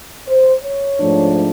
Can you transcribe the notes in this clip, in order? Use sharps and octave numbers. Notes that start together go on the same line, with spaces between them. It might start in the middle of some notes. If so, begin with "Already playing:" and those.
C5
C#5
G#2 F3 A3 D4